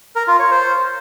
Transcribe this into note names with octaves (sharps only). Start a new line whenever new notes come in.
A#4
F4
C#5
C5